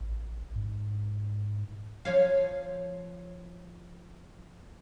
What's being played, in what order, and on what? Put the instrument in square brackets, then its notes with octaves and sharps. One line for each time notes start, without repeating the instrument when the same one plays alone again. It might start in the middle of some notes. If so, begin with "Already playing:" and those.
[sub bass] A1
G#2
[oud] F3 C#5 F5